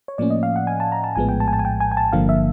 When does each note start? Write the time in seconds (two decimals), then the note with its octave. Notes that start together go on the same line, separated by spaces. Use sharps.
0.08 C#5
0.18 A2 F3 A#3 C#4 D5
0.30 D#5
0.43 F5
0.56 F#5
0.67 G#5
0.80 A5
0.92 A#5
1.04 A5
1.16 A#1 A2 F3 G#3 B3 G#5
1.29 G5
1.40 A5
1.48 G#5
1.53 A5
1.59 G#5
1.65 G5
1.80 G#5
1.92 G#5
1.97 A5
2.12 G1 G2 D3 F3 A#3 F5
2.29 E5